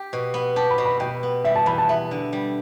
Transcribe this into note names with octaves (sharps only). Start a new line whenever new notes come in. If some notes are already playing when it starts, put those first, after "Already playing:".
Already playing: G4
B2
B3
G4 A5
B5
B2
B5
B2 G5
B3
G3 E5
A5
E2 B5
A5
B3 E5
D3
G3